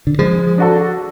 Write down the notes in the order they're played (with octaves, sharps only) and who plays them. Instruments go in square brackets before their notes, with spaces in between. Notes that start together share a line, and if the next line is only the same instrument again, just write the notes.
[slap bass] D3
[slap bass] F3 [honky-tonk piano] G#3
[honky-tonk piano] D4 F#4 A4